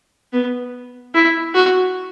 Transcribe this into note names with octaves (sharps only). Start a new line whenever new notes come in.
B3
E4
F#4